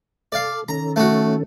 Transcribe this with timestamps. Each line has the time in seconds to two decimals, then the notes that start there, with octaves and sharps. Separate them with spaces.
0.32 A4 D5 F5
0.69 D#3 C#4 A4 A#5
0.96 A3 F#4